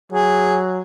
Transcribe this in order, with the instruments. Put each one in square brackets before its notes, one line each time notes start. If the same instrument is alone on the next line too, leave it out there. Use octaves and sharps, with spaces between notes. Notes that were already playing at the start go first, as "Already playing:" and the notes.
[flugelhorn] F#3 [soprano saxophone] G#4